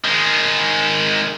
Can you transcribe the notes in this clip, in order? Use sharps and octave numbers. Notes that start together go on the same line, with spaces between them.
D#3 G#3